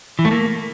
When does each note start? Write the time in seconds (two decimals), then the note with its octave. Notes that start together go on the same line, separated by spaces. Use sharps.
0.19 E3
0.25 A3
0.31 A#3